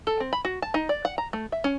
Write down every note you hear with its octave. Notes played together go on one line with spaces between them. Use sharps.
A4
C4
B5
F#4
A5
D#4
D5
F#5
A#5
A3
E5
C#4